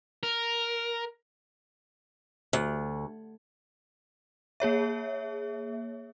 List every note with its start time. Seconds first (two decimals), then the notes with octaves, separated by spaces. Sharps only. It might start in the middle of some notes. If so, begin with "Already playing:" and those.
0.23 A#4
2.53 D2
4.60 A#3 G#4 C#5 E5